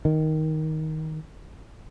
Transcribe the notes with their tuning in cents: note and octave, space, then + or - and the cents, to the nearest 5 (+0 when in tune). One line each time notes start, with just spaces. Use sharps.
D#3 +10